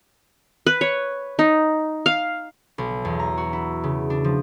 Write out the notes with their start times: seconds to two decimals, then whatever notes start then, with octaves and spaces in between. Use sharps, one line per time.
0.66 B4
0.81 C#5
1.39 D#4
2.06 F5
2.78 B1
3.05 E2
3.19 A#5
3.37 F#4
3.53 E4
3.84 C#3
4.10 D4
4.24 F3